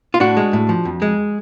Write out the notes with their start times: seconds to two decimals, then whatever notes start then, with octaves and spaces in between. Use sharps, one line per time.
0.14 F4
0.20 A2 D4 F#4
0.37 G#3
0.53 A2
0.69 F3
0.85 F2
1.02 G#3